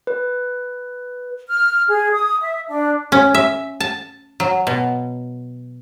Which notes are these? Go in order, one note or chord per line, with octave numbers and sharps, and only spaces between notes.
B4
F6
G#4
D#6
E5
D4
C#4
E5
A5
F#3
B2